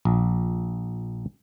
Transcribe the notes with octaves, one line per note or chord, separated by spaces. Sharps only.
A#1